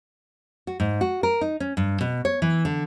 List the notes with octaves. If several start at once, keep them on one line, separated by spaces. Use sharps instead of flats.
F#4
G#2
F#4
A#4
D#4
C#4
G2
B2
C#5
E3
D3